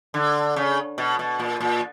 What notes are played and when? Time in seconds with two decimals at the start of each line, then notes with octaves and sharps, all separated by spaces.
0.14 D3
0.56 C#3
0.98 B2
1.19 B2
1.40 A#2
1.60 A#2